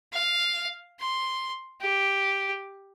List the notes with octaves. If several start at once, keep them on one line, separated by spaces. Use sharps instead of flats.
F5
C6
G4